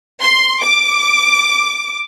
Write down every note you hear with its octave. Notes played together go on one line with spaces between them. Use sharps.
C6
D6